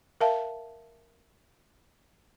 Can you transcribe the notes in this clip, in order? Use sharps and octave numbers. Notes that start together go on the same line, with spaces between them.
A#4 E5 F5 A5